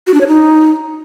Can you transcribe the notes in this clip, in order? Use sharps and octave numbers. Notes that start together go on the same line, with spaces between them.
F#4
D4
C#5
D#4